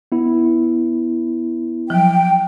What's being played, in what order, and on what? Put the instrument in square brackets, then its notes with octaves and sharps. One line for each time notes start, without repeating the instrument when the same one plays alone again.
[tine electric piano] B3 E4
[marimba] F3 F#3 [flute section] G5